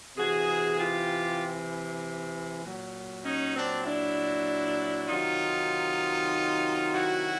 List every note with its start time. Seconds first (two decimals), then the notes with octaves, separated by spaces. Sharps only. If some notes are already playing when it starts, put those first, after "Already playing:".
0.17 C3 E3 F#4 G#4
0.78 F4 G4
2.62 A#2 F#3
3.24 C#4 D#4
3.55 C4 D4
3.86 D4 E4
5.08 C3 D#3 F#3 D#4 F4
6.93 E4 F#4